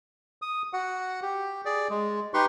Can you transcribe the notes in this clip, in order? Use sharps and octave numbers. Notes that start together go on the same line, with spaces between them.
D#6
F#4 F#5
G4
G#4 D5
G#3
D#4 G4 B4 C6 C#6